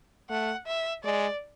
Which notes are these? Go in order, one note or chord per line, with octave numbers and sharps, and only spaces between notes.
A3 F#5
E5
G#3 D5